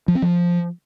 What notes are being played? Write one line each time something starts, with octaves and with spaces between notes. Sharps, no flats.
F3
C4
F3